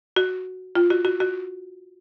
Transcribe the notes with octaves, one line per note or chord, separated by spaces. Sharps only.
F#4
F4
F#4
F#4
F#4